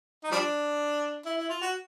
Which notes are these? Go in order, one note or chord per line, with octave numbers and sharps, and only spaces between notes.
D#4
F3 G3 D4
E4
E4
F4
F#4